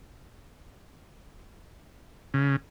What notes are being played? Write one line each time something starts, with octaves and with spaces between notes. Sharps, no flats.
C#3